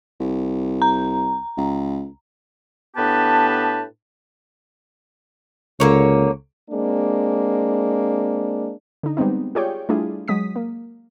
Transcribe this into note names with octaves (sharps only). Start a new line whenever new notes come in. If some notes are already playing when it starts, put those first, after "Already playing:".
C2
A#5
C#2
A2 B3 D4 G4 B4 A5
C#2 D3 A#3 C#5
G#3 A#3 C4 D4
D3 D#4
G3 G#3 B3 C4 D#4
F4 G4 G#4 C#5 D5 G5
G3 A3 D4 E4 F4 G#4
F#3 G#3 D#6 B6
A#3